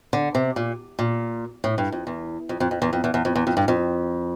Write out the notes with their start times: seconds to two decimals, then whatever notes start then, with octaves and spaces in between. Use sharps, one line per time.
0.13 D3
0.35 C3
0.56 A#2
0.99 A#2
1.64 A2
1.78 G2
1.92 F2
2.07 E2
2.49 F2
2.60 F2
2.71 F2
2.82 E2
2.93 F2
3.04 E2
3.14 E2
3.25 F2
3.36 E2
3.47 F2
3.57 G2
3.68 F2